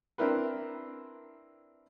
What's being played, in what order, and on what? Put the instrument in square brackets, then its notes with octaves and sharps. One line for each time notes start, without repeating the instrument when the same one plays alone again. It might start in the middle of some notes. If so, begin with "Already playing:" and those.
[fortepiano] C4 D4 E4 A#4 B4